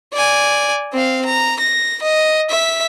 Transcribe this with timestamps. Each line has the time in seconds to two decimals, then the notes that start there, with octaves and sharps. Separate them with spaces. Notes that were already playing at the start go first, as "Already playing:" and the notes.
0.14 D5 G#5
0.93 C4 F5
1.25 A#5
1.60 A#6
2.02 D#5
2.50 E5 B6